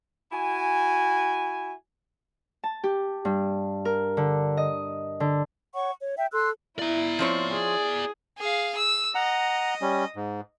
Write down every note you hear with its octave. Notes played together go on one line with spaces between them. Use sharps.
E4 F#4 G#5
A5
G4
G2
A#4
D3
D#5
D3
C#5 F#5 C#6
C#5
E5 G5
A4 C6 E6 F#6
E4 D5 A#5
F3 C4 C#5
G#4
G#4 F5
E6
D#5 F#5 A#5
G3 C#4
G#2